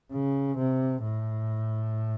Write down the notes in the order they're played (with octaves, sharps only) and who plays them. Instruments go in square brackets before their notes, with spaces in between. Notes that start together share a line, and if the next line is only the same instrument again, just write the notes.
[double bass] C#3
C3
A2